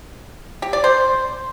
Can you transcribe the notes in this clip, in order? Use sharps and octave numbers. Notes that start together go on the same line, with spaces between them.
G4
D5
C5